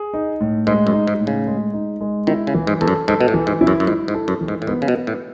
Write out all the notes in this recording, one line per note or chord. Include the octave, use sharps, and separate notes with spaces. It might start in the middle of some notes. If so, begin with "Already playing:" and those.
Already playing: G#4
D#4
A2
G#2 G#3
F#2
D#4
G#2
A2
C#3
G#3
D#4
G#3
D#3 E4
C#3
E3
G#2
E2 A4
F#2
G#2 A4
B2
A2
E3
G#2
E4
F#2
F#2
G#2 E4
G#2
A4
F#2
E3
G#2
A2
G#2 B3
C#3
B2
B3
A2